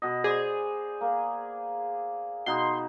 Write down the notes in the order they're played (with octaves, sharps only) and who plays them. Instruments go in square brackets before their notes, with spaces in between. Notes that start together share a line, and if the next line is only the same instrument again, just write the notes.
[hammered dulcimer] B2 D#5
[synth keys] G#4 [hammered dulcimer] C5 D5
[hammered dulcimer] A#3
[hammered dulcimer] B2 D#4 G#4 [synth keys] C6